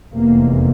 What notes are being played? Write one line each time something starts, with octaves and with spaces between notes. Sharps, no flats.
F1 E2 C3 A#3